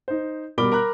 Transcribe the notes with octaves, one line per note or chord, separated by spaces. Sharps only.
D#4 C5
B2 G3 A#4 B5 D6 G7
A#4 A#5 B5 F#6